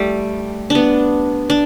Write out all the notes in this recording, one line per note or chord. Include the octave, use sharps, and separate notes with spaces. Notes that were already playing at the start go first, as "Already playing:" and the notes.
Already playing: G3 A3
B3 D4
D4